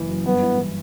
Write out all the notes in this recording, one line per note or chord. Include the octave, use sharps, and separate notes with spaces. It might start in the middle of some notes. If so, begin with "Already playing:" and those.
Already playing: F#1 E3
F#2
G2 B3
E4
E3